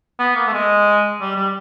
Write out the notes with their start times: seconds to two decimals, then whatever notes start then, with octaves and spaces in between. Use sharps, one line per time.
0.19 B3
0.36 A#3
0.47 A3
0.53 G#3
1.20 G3
1.36 G3